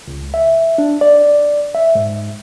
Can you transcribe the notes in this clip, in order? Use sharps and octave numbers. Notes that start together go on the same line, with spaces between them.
C#2
E5
D4
D5
E5
G#2